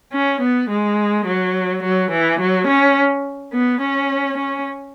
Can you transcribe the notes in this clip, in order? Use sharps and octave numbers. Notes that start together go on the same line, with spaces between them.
C#4
B3
G#3
F#3
F#3
E3
F#3
C#4
B3
C#4
C#4